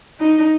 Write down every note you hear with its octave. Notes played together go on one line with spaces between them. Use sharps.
D#4